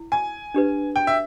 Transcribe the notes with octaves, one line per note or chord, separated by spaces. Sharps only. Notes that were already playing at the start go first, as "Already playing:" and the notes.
Already playing: E4
G#5
D4 G4 B4
G5
E5